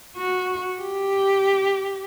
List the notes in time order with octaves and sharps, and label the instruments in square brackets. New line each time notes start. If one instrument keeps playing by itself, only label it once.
[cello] F#4
G4